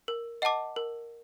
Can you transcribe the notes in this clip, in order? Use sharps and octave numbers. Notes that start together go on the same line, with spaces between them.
A#4
D#5 F#5 A5 D6
A#4